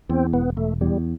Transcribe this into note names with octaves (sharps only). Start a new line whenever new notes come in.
E2 C4
E1 B3
E1 A3
E2 G3